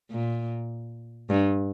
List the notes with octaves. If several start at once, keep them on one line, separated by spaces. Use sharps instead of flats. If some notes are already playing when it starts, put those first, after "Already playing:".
A#2
G2